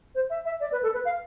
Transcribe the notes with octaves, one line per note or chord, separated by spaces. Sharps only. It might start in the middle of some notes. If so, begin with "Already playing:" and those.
C5
E5
E5
D5
B4
A4
B4
F5